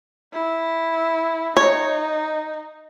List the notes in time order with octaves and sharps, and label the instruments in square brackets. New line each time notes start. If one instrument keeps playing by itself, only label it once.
[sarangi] E4
[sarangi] D#4 [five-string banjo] C#5